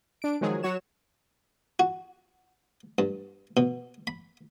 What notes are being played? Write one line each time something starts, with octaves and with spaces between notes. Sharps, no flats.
D4 D7
D#3 F3 F#3 G#3 G#4
F#3 F#4 C#5 E7
F#4
G2
B2
B5